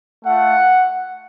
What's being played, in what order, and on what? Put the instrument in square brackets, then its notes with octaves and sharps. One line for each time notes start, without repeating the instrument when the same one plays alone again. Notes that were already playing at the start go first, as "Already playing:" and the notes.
[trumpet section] A3 F4 F#5